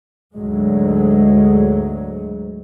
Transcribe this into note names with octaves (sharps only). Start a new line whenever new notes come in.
D2 G#2 F#3 G#3